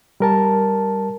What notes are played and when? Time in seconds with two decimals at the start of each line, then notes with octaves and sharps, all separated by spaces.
0.20 G3 A#4 A5